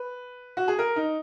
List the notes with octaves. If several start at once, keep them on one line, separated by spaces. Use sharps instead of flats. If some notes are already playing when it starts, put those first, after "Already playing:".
Already playing: B4
F#4
G#4
A#4
D#4